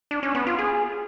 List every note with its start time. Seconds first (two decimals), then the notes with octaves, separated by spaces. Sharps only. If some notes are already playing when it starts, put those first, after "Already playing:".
0.11 D4
0.23 C#4
0.35 B3
0.47 F4
0.59 G#4